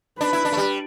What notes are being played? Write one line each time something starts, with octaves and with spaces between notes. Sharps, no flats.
D4 B4
E4
D4
A3
G3